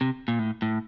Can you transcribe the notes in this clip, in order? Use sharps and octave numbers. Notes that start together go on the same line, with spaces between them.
C3
A#2
A2
A2